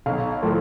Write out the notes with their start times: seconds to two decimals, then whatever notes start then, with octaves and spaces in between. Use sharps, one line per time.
0.06 B1 F5
0.42 A2 F3 A3